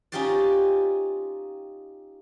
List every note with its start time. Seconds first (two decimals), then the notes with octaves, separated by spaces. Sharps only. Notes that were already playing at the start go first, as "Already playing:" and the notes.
0.12 C#4 D#4 F4 G4 C5 D5